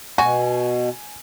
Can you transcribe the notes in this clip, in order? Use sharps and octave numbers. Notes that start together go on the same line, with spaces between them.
B2 F#4 G#5